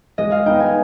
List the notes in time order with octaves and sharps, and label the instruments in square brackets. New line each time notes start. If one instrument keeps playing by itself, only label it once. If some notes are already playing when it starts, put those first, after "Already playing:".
[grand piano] G#3 [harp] D#5
[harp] F5
[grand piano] B3 D#4 [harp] G5
[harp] G#5